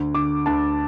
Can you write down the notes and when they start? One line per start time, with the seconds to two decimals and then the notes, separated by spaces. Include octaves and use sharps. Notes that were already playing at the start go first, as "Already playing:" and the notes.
Already playing: D2
0.15 D3 D6
0.46 D2 A5